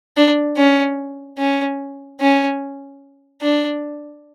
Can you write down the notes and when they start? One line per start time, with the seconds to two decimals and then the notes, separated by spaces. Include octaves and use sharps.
0.17 D4
0.57 C#4
1.38 C#4
2.21 C#4
3.42 D4